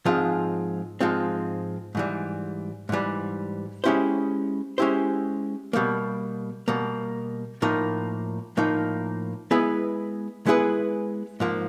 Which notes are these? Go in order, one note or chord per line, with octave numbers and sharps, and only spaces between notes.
G#2 F3 G#3 C4 F4
G#2 F3 G#3 C4 F4
G#2 E3 G3
G#2 E3 G3
G#3 C#4 E4 G4 C5
G#3 C#4 E4 G4 C5
B2 G3 A#3
B2 G3 A#3
A2 F3 A#3 D#4
A2 F3 A#3 D#4
G#3 B3 E4 G#4 B4
G#3 B3 E4 G#4 B4
G#2 F3 A#3